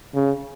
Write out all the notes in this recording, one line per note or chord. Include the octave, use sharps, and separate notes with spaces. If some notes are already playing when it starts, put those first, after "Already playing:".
C#3